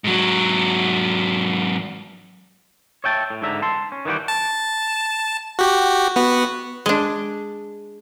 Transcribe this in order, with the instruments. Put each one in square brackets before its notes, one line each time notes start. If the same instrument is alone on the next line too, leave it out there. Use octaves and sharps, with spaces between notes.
[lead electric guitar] G#2 F#3
[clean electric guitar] C#5 E5 G5 A5
A2
G#2 D3 E5 A#5
A5 C6
C#4
D#3 E3 G3 F#4 G4
[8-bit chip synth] A5
F#4 G4
B3 F#4
[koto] G#3 D4